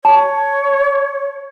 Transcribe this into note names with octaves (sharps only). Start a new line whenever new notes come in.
C#5 A5